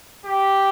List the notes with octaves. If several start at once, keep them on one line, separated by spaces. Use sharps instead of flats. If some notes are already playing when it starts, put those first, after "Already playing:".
G4